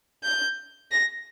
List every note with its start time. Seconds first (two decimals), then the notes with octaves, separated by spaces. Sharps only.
0.24 G6
0.92 A#6